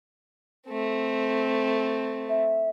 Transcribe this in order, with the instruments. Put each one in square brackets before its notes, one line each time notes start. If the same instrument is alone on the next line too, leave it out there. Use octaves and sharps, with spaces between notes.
[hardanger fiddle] A3 C4
[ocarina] E5